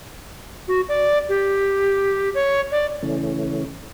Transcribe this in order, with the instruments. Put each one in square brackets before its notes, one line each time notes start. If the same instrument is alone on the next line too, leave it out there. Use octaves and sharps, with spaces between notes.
[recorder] F#4
D5
G4
C#5
D5
[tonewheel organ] C#3 E3 A3 C#4